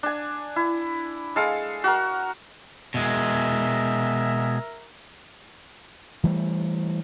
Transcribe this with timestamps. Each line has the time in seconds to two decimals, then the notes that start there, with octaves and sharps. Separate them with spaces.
0.03 D4 G#5
0.56 E4
1.36 G#3 A4 F5
1.84 F#4 A#4
2.94 B2 G#3 A#4 E5
6.24 E3 G3 A3